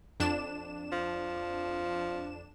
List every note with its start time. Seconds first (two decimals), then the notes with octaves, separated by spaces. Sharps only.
0.20 F2 D4 E7
0.92 F3